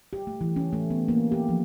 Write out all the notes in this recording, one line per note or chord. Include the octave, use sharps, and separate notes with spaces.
G4
A3
E3
C#4
A3
B3
A#3
G4
F3